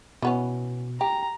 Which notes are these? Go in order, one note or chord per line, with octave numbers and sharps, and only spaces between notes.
B2 E3 B3 C#4
G4 A#5